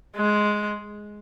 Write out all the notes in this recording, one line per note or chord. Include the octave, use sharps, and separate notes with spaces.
G#3